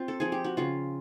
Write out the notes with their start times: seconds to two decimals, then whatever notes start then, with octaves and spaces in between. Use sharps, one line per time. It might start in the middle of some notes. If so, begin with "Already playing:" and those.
Already playing: C4 F4
0.08 A4
0.20 F3 G#4
0.32 G4
0.44 F#4
0.57 C#3 F4